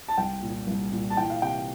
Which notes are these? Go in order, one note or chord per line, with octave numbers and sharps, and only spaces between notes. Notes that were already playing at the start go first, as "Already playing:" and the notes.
A5
C2 G5
A#2
C2
A#2
A5
E3 G5
F5
C3 G5